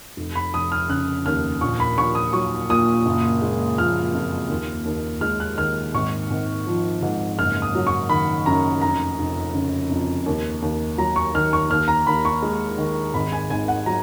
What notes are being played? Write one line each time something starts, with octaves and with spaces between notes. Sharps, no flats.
F1
B5
F1 D#6
F6
C#3 F#6
D#2 F6
A#1 C#6
B5
A#1 C#6
D#6
F#3 C#6
A#2 D#6
F#1
G#3
F3 F6
F2
D#2
D#2
G#3 F6
F#6
D#3 F6
G#1 C#6
G#1
F3
G#2
F#1 F6
D#6
F#3
C#6
D#3 B5
F#2 A#5
F1 A#5
F1
C#3
F2
D#2
D#2
F#3 A#5
C#6
D#3 F6
C#6
D#2 F6
A#5
D#2 B5
C#6
G#3
D#3
G#1 B5
G#5
G#1 G#5
F#5
F#3 A#5